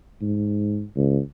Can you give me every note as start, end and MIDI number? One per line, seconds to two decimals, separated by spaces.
0.21 0.84 44
0.96 1.19 37